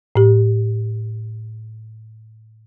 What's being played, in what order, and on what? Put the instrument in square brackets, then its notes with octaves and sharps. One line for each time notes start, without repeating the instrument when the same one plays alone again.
[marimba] A2 G4